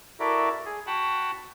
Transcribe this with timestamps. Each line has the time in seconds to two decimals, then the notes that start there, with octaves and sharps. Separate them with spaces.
0.20 E4 F#4 A4 A#4 D5 E5
0.66 G#4
0.87 F#4 F#5 G5 A5 B5